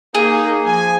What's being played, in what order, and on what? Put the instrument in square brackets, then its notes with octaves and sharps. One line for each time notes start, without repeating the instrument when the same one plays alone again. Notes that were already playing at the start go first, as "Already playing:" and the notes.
[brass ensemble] A#3 D#4 [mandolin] G#4
[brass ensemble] F3 G#5